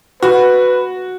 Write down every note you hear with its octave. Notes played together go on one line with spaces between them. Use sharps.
F#4 B4